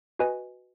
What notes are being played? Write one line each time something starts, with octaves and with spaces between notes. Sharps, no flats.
F#4 B4 D#5 G#5